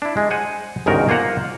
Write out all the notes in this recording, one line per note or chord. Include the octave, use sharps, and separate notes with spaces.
D4 E4
G#3
C5 F#5 G#5
G1 C#2 G#2 D#3 F#4 A#4
A#3 F4 C5 F#5 A#5